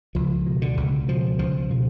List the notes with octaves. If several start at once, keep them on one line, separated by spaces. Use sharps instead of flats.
C#2 F3
B2
D3
C#2
B2 F3
C#2 F3
B2 F3